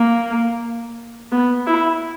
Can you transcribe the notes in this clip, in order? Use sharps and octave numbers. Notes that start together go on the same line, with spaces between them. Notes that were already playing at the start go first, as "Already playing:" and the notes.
Already playing: A#3
B3
E4